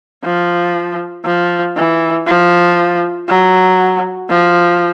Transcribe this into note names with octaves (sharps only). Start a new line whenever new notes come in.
F3
F3
E3
F3
F#3
F3